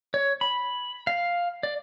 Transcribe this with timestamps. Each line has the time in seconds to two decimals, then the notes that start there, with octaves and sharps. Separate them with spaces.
0.14 C#5
0.41 B5
1.07 F5
1.63 D5